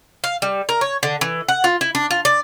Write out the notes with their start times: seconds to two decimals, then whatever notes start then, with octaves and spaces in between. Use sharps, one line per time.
0.24 F5
0.42 G3
0.69 A#4
0.81 C#5
1.03 D3
1.21 E3
1.48 F#5
1.64 F4
1.81 E4
1.95 D4
2.11 F4
2.25 D5